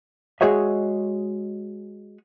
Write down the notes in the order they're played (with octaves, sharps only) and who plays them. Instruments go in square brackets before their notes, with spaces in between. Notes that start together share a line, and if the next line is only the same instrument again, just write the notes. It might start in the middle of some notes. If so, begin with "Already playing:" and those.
[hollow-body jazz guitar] G#3 F#4 G#4 C#5 D#5 E5